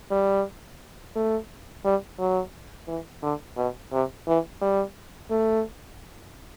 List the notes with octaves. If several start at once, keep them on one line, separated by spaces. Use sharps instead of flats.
G3
A3
G3
F#3
E3
D3
B2
C3
E3
G3
A3